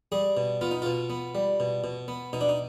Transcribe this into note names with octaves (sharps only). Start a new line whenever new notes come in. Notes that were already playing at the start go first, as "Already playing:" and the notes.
G3 G#4
B2
B3 F4
D#4
B2 F4
B3
G3
B2
B2
B3
B2 D#4
D4
D#4